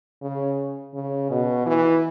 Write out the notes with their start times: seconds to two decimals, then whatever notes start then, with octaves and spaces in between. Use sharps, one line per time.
0.22 C#3
0.94 C#3
1.30 B2
1.66 E3